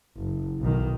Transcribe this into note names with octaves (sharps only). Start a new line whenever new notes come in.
F#1
B1 D#3